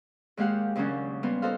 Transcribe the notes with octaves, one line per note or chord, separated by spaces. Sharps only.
D#2 G#3 A#3 G4 F5 F#5
D#2 C#3 F#3 A#3 C#4 D4
G3 A#3 B3 F4 A#4
D#4 F#4 A4 C5 F5